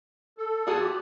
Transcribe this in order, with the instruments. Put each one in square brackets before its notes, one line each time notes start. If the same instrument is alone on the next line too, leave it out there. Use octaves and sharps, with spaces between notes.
[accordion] A4
[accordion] E2 A5 D#6 [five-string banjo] F4 F#4 G#4
[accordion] G4